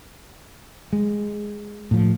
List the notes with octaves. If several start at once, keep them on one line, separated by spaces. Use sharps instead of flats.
G#3
A2 F3